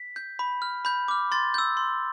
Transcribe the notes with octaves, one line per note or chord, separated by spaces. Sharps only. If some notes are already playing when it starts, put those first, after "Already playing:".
Already playing: B6
G6
B5
F6
B5 G6
D6 F6
C6 A6
E6 G6
C6